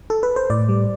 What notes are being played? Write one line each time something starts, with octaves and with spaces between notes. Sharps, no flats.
A4
B4
C5
A2 D5
G3